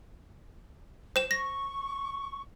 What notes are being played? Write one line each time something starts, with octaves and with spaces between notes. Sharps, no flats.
C5 E7
C#6 A#6